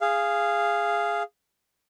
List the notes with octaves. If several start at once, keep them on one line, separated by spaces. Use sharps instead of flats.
G#4 F5